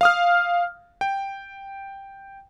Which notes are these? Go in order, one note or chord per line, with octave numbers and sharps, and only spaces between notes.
F5 D#6 F6
G5